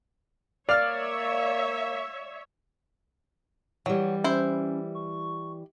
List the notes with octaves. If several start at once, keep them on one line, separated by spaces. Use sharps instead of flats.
A#3 C#5 D5 E5 F5 F6 A6
E3 F#3 G3
C#4 E4 C5
C#6